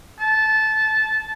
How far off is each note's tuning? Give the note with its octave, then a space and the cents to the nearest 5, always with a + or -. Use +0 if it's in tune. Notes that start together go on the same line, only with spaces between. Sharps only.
A5 -15